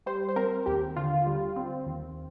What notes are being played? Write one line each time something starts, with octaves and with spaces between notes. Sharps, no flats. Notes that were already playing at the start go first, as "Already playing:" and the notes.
G3 C5
C5
C4 A#4
D#2 G4
D3 F4
G3
C4
D#2